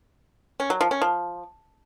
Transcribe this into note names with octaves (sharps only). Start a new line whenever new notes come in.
C#4
F#3
F3
C#4
F3